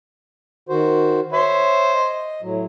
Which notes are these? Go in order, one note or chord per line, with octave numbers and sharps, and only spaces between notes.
D#3 F#4 C5
C5 C#5 E5
D#5
A2 F#3